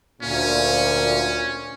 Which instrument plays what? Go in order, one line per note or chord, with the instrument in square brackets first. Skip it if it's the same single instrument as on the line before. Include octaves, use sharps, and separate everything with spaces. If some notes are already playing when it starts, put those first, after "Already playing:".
[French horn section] D2 A#2 [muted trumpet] C#4